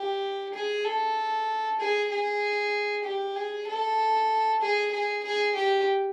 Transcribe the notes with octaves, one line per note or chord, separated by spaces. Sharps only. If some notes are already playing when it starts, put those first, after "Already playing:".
Already playing: G4
G#4
A4
G#4
G#4
G4
G#4
A4
G#4
G#4
G#4
G4